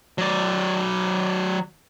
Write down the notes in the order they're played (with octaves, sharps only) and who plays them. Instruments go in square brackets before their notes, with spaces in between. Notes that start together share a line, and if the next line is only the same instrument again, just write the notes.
[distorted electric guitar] F#3 D5